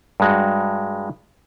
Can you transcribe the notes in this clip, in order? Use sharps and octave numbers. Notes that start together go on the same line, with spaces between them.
G2 G#3 F#4